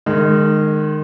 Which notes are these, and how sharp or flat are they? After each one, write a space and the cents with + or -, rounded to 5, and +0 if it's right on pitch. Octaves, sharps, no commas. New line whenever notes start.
D#3 -25 G#3 +0